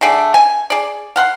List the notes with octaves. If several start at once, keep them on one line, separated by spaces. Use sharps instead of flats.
D3 A3 G#4 D5
G#5
G#4 D5
F5 F#5 C6